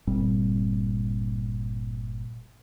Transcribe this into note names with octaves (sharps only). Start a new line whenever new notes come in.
G1 A#2 G3 C4